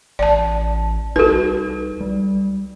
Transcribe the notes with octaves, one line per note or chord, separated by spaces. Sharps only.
A1 D5 A5
C2 D#4 F#4 A4 B4
G3